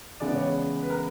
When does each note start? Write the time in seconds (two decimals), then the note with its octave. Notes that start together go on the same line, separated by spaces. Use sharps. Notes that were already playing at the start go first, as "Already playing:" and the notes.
0.20 C#3 E3 G#3 B3 D5
0.36 C#5
0.82 B4
0.90 A#4